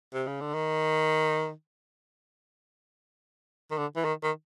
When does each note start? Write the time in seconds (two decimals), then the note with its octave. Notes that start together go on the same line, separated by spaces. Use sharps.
0.14 C3
0.27 C#3
0.41 D3
0.54 D#3
3.71 D#3
3.78 D3
3.96 E3
4.04 D#3
4.23 D#3